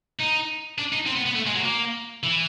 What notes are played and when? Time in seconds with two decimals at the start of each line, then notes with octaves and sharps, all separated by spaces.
0.19 D#4
0.78 D4
0.93 D#4
1.07 C4
1.16 B3
1.27 B3
1.36 A3
1.47 G#3
1.56 F#3
1.65 A#3
2.23 E3